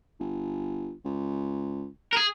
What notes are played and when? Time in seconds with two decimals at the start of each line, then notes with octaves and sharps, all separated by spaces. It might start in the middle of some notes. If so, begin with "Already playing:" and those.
0.20 G1
1.05 C#2
2.13 G#4 A#4